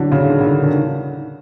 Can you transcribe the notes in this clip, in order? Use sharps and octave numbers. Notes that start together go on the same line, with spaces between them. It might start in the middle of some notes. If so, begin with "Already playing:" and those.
Already playing: D3 E3 F#3
C#3
D#3
D3
D#3